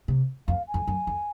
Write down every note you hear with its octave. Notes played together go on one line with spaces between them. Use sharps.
C3
F2 F5
G#5
F2
F#2
F2